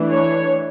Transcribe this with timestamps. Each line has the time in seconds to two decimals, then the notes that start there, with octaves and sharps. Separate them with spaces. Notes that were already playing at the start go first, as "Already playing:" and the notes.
Already playing: E3 A3 D4
0.10 C#5